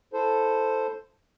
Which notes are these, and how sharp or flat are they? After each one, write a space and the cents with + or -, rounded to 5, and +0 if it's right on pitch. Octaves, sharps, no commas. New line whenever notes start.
E4 +5 A4 +0 C5 +0